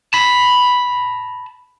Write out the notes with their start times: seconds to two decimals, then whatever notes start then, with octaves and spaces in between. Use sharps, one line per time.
0.13 A5 B5